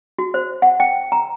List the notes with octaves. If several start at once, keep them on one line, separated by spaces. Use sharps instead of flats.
F#4
C5
F#5
G5
A#5